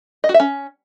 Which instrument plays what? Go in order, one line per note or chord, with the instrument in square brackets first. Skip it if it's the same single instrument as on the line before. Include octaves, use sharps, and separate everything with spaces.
[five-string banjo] D#5
F#4
E5
C#4